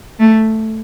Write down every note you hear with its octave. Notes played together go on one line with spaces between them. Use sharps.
A3